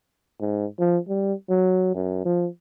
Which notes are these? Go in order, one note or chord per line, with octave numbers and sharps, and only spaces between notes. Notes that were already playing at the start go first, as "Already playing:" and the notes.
G#2
F3
G3
F#3
F#2
F3